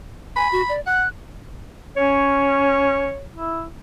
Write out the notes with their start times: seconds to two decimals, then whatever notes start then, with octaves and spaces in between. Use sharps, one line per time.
0.36 G#5 B5
0.52 F#4
0.69 D5
0.86 F#5 F#6
1.96 C#4 C#5
3.32 E4